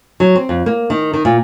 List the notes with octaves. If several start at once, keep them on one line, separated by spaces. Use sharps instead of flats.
F#3
C4
F2
A#3
D#3
D#3
A#2